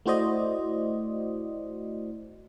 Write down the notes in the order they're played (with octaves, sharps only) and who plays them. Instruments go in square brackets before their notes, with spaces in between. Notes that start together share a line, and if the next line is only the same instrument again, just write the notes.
[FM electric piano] A3 E4 F#4 C5 D5 D#5